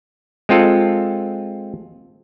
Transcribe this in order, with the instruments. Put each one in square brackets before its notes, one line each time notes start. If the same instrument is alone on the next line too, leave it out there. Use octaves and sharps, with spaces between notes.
[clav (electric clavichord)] G#3 C4 F4 A4